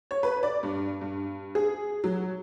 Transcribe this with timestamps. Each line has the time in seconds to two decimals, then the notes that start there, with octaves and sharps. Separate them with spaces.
0.11 C#5
0.23 B4
0.43 D5
0.63 G2
1.01 G2
1.55 G#4
2.04 F#3